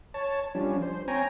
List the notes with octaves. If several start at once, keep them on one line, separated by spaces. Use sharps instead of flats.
C#5 A5
F3 G3 C#4 D4
C5
C4 C#5 G5 G#5 A#5